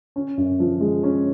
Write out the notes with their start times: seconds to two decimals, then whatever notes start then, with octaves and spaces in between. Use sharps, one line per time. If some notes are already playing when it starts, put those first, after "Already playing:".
0.16 C#4
0.37 F#2
0.60 F3
0.81 G#3
1.03 C#4